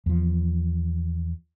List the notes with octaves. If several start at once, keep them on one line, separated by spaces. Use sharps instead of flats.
E2 F3